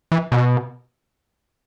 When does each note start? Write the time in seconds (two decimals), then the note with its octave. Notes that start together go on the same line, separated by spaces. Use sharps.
0.12 E3
0.32 B2